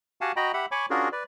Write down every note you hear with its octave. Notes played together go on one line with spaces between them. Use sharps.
F#4 G4 F5 F#5 G#5 A5
F#4 D#5 G5 A#5 B5
G4 E5 F#5 B5
C#5 G#5 B5 C#6 D6
C#4 D4 F4 F#4 G#4 A#4
B4 D5